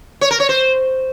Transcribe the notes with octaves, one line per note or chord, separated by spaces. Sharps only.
C#5
A#4
C#5
C5